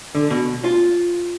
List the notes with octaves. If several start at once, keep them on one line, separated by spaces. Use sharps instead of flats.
D3
B2
F4